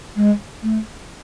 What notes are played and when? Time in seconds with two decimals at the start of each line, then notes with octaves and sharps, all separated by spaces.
0.16 G#3
0.62 A3